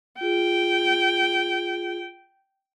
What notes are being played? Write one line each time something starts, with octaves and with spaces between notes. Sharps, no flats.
F4 G#4 G5